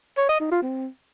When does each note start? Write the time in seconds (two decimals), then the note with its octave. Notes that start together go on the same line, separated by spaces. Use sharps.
0.18 C#5
0.29 D#5
0.40 D#4
0.51 F4
0.63 C4